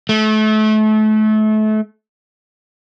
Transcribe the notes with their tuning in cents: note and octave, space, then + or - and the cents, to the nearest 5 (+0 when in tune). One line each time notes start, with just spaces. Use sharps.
A3 -30